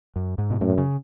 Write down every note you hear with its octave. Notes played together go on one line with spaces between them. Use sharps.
F#2
G#2
B2
F#2 A2
C#3